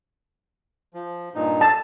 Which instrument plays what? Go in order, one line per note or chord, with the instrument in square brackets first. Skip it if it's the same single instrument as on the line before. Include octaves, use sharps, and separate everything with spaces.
[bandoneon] F3
G2 A#2 D#4
[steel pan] A5